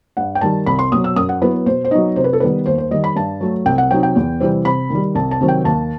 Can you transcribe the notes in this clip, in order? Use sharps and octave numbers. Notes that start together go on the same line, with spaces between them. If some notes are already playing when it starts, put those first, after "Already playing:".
G2 F#5
G5
D#3 G3 A5
C2 B5
C6
B2 F#3 D#6
E6
F#2 D#6
F#5
F#3 B3 E4 B4
B2 C5
C5
F#3 B3 D#4 D#5
C3 C5
B4
A4
D#3 G3 B3 B4
D#2 C5
C5
D#3 G3 D#5
B5
G2 A5
F#3 A3
C2 G5
F#5
C3 F#3 C4 D#4 G5
G5
E2
C3 E3 G3 C4
C3 B5
D#3 G3
C2 A5
A5
C3 D#3 F#3 C4
G5
D#2 A5